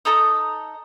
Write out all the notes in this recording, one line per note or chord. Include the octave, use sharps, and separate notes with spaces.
D#4 A4 A#5 D#6